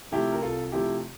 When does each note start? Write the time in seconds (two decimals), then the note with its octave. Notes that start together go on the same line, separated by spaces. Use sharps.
0.12 C3 F3 A3 E4 G4
0.32 A#4
0.42 C2 F4 A4
0.72 C3 F3 A3 E4 G4